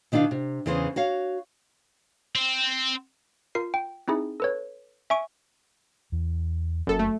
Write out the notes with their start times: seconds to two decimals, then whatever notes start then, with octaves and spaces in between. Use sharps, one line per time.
0.12 B2 D#3 D4 E4 F5
0.31 C3
0.66 E2 C#3 E3 G#4 C5
0.96 F#4 C#5 F5
2.36 C4
3.55 F4 A#4 C7
3.74 G5
4.08 C4 D#4 E4 G#4
4.40 A4 B4 C#5
5.10 E5 G#5 C#6 D7
6.12 E2 E3
6.87 F#1 F#2 C3 A#3 A4
6.99 A3